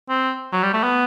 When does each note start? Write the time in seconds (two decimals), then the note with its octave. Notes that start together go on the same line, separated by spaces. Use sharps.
0.09 C4
0.53 F#3
0.63 G3
0.73 A3
0.83 B3